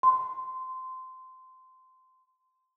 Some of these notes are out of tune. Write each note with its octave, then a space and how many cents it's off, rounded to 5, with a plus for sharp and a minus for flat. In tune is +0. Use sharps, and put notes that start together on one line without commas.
C6 -20